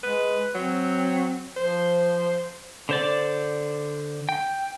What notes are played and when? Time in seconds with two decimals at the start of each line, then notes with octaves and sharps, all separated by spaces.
0.04 G#3 B4
0.55 F#3 C4
1.57 F3 C5
2.89 D3 C5 D5
4.29 G5